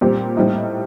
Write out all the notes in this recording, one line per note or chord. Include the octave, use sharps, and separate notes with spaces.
A#2 G3 C4 G4
A2 G3 C4 D#4